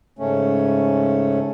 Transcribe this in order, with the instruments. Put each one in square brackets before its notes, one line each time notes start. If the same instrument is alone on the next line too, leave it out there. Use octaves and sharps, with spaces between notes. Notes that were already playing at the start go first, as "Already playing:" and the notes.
[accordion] G#2 C#3 A3 C#4